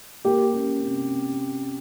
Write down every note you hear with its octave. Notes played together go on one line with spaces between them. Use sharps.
A#3 G4
C#4
C3